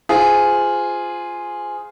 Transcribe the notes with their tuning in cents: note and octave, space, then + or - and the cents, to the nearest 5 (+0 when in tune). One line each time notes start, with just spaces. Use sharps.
F4 +0 G#4 +0 C5 -25